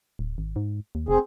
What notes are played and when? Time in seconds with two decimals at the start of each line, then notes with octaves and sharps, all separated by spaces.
0.19 D1
0.38 G#1
0.56 G#2
0.95 D#2
1.09 F1 C4 G#4